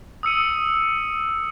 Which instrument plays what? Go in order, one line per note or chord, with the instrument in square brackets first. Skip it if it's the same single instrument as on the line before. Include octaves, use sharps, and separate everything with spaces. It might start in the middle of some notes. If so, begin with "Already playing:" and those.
[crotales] D#6 E6 C#7 D#7